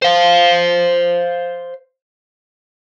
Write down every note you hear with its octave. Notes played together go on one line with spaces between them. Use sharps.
C5 F5